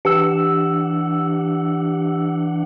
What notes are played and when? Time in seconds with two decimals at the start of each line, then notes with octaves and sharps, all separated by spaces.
0.05 E3 D4 G4 F#5 E6